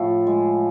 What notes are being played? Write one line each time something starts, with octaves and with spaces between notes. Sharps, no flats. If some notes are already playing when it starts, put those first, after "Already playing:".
Already playing: A2 F3
G#3